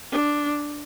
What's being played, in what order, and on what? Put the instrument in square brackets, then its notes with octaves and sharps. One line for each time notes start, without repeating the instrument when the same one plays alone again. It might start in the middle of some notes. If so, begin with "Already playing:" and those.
[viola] D4